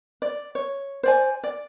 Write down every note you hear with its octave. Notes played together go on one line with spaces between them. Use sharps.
D5
C#5
C5 D5 G#5
D5